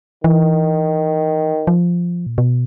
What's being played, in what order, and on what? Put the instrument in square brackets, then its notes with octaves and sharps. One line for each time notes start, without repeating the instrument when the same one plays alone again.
[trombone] D#3 [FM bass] E3
[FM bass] F3
A#2
B2